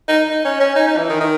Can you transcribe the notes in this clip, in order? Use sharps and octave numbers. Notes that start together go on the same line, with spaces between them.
D#4
D#4
C#4
C#4
D#4
D#4
E3
D#3
D#3